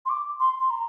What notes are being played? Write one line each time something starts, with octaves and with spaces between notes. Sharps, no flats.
C6
D6
C6
C6
A#5